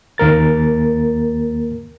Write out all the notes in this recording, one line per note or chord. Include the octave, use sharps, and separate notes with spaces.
D#2 A#3 A#4 A6